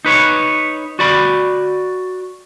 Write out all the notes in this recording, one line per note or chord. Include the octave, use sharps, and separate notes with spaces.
D#4 B4 C#5
F#4 D5 B5